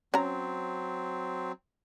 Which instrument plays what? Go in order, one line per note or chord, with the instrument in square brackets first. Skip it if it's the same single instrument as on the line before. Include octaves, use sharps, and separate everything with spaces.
[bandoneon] F#3 C4 [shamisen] C#4 A#5